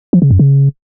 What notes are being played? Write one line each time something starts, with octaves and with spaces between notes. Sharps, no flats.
F3
C#3
F#2
C#3